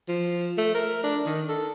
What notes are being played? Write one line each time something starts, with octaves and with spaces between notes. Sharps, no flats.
F3
A3
A#4
D4
D#3
A4